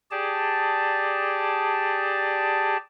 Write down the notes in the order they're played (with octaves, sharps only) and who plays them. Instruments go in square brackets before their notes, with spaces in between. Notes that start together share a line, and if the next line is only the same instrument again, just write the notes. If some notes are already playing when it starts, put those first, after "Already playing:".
[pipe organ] G4 G#4 D5 A5